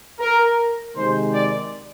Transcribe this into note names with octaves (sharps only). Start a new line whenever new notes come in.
A#4
C3 D#3 G#3 C5
D5